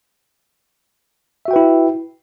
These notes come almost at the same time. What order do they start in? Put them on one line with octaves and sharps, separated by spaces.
E5 F#4 G5 B4 E4